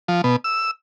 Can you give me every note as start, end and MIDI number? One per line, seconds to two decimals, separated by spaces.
0.08 0.21 53
0.24 0.36 47
0.44 0.71 88